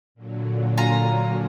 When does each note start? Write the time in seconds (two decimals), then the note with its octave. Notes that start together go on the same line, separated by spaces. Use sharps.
0.15 A#2 D3 F#3
0.78 F4 G#5 A#5